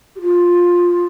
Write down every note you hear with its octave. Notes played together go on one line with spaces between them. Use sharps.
G4
F4